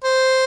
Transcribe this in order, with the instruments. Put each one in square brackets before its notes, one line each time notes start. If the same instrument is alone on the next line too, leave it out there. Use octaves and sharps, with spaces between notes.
[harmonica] C5